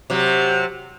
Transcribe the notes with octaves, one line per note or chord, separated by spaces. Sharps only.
C3 F#3